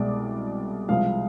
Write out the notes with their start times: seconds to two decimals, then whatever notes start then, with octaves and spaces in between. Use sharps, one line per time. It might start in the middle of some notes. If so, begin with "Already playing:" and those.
Already playing: C2 B2 G#3 D5
0.89 C2 C3 F3 G#3 F5